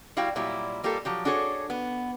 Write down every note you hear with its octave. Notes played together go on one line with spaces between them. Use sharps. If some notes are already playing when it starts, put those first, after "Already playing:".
G3 E4 F#4 F5 G5
A#2 F#3 G3 E4
G3 A#3 F4 G4 A4
F3 F#3 G4
D4 F#4 G#4 A4 C#5
B3